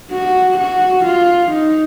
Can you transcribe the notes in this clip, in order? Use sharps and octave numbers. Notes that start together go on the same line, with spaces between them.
F#4
F#4
F4
D#4